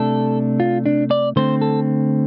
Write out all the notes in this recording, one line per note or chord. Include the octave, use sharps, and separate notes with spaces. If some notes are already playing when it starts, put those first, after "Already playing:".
Already playing: C3 A3 D4 A4
F4
D4
D5
D3 A3 C4 C5
A4